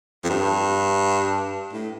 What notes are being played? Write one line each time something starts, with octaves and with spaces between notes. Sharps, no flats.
F2
G2
A2